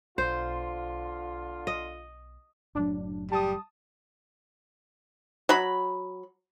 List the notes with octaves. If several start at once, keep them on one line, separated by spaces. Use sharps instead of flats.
B1 D3 F4 C5
D#5
F#1 A2 F#3 D4
G3 A5 D#6
F#3 B5